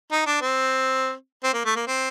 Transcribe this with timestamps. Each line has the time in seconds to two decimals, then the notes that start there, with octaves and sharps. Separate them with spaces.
0.12 D#4
0.27 D4
0.41 C4
1.44 C4
1.54 A#3
1.65 A3
1.76 A#3
1.87 C4